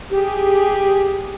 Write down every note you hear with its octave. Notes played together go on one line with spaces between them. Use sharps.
G4 G#4